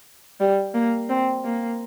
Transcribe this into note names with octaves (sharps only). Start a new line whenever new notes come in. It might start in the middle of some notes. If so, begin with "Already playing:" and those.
G3
A#3
C4
A#3